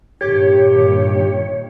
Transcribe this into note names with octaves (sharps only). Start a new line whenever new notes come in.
G2 A#2 D#3 G4 C#5